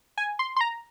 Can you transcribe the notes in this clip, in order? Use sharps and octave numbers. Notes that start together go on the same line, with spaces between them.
G#5
C6
C6
A#5